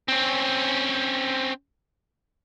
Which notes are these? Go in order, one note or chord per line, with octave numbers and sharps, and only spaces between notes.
C4 C#4